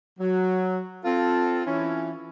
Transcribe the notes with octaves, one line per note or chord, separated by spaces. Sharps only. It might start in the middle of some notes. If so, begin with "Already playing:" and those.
F#3
C4 F4 A4
E3 C#4 E4